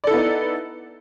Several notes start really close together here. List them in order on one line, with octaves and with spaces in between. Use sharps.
D5 A4 E4 B3 D#4